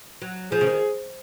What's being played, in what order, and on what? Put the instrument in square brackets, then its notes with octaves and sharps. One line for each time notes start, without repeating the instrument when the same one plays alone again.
[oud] F#3
[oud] F3 [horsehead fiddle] G#4
[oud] C#3
D#3